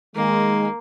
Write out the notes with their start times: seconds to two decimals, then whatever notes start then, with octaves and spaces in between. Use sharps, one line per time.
0.16 D#3 G#3 A#3